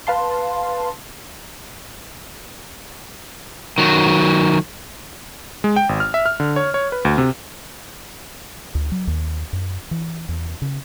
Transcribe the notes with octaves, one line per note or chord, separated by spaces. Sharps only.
B4 F5 A5 C6
D#3 F#3
G#3
G5
G#1
F6
E5
F6
D3
C#5
C#5
B4
D2
C3
D2
F#3
D#2
F#2
E3
E2
C#3